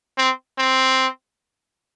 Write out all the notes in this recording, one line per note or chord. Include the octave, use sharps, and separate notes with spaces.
C4
C4